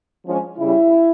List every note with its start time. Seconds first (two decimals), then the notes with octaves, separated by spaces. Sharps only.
0.25 F3 G#3 C#4
0.59 C#3 G3 C#4 E4